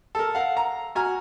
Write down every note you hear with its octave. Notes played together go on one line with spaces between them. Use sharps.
A4 A#4
F5 F#5
A#5
F#4 G#5 A#5 F6